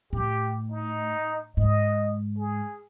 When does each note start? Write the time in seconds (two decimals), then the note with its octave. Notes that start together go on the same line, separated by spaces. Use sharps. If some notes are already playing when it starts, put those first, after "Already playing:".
0.13 A2 G4
0.71 D#4
1.57 G#2 D#5
2.38 G#4